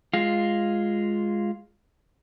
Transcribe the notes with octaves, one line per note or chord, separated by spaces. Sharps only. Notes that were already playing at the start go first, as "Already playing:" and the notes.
G#3 F4